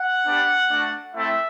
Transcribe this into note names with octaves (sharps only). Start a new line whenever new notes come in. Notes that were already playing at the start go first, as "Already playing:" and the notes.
Already playing: F#5
B3 D4 G4
A3 D4 F#4
A3 C4 E4 E5